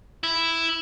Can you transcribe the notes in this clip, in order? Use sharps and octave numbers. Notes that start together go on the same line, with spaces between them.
E4